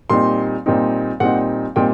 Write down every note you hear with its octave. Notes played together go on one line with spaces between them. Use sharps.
A#2 G3 C4 D#4 C6
A#2 G3 C4 D#4
A#2 G3 C4 D#4 F#5
A#2 G3 C4 D#4 G5